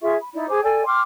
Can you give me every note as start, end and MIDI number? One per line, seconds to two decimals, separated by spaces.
0.01 0.14 65
0.01 0.14 68
0.01 0.14 76
0.01 0.14 85
0.20 0.30 83
0.33 0.48 63
0.33 0.48 64
0.33 0.48 74
0.48 0.62 68
0.48 0.62 72
0.48 0.62 80
0.48 0.62 86
0.63 0.83 69
0.63 0.83 74
0.63 0.83 79
0.63 0.83 80
0.85 1.01 79
0.85 1.01 84
0.85 1.01 86
0.85 1.01 89